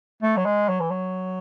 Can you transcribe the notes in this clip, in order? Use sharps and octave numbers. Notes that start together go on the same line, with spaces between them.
A3
F#3
G#3
F#3
E3
F#3